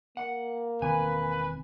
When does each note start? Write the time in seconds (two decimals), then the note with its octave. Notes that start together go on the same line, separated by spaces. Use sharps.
0.17 A#3 F#5
0.82 E1 D#3 C4 B4 G#5